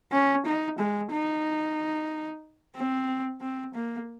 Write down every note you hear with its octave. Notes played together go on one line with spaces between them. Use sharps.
C#4
D#4
G#3
D#4
C4
C4
A#3